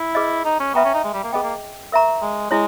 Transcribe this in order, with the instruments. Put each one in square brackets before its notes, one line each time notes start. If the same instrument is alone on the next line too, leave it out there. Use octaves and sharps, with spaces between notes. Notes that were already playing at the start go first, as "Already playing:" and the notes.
Already playing: [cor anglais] E4
[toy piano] G#4 B4 D#5
[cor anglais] D#4
C#4
[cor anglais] B3 [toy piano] B4 E5 G5 A#5 C#6
[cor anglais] C#4
D#4
G#3
G3
A#3
[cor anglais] B3 [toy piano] G#4 D#5 G5
[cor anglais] A#3
[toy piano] A#4 E5 A#5 C#6
[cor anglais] G#3
[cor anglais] G#3 [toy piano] E4 G#4 C#5